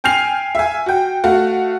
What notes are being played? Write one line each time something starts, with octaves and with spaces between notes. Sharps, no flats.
G5 G#5 F6 C7 F7
E5 G#5
F#4 G5
A3 F#4 F5 F#5